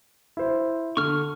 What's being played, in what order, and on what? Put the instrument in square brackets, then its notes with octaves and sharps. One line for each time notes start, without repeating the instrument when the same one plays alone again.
[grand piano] E4 C5
[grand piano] D3 [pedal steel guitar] C#6 F6